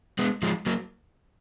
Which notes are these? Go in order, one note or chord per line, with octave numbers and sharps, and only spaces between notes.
G#3 B3
F3 G#3
F#3 A#3